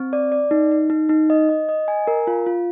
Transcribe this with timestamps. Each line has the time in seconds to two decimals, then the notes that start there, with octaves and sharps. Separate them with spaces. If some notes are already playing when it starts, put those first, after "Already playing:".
Already playing: C4
0.13 D5
0.32 D5
0.51 D#4
0.71 D#4
0.90 D#4
1.09 D#4
1.30 D#5
1.49 D#5
1.69 D#5
1.88 G#5
2.07 A#4
2.27 F4
2.46 F4